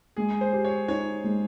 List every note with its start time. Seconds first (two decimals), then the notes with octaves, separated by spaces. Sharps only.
0.16 G#3 G#4
0.41 C5
0.53 G4
0.64 C#5
0.88 D#4 C#5
1.24 G#3